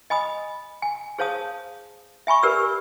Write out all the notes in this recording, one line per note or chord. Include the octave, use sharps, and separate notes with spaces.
D#5 G#5 B5 D#6
G#5
G#4 C5 C#5 F5 A5 D#6
E5 G#5 B5 C#6
G4 A#4 B4 D5 E6